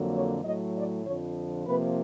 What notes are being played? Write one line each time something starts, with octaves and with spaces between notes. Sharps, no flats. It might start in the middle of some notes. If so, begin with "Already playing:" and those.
Already playing: F2 D3 F#3 A#3
C#5
A2 F#3 A3 D#5
D5
F2 D3 F3 C#5
C3 F3 A#3 B4